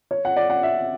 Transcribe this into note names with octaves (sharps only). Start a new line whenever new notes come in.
C#5
F#5
D5
F#5
E5